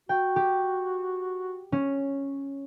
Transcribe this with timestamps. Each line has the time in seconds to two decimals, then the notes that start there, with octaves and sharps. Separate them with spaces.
0.09 F#4 G5
0.36 G4
1.72 C#4